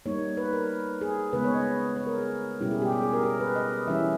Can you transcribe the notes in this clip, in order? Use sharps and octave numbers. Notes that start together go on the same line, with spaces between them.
G3 A#3 D#4 C#5
B4
A#4
G#4
C#3 G#3 B3 B4
C#5
D#5
C#5
A#4
G#4
B2 G3 C#4 E4 G4
G#4
G4
G4
G#4
A#4
A#4
B4
D#5
E3 G3 C#4 E4 E5